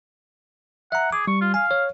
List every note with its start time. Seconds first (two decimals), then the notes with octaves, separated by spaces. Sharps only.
0.92 E5 F#5 A#5
1.13 G#4 D6
1.27 G3 C#6
1.41 F4
1.54 F5 G#5
1.71 C#5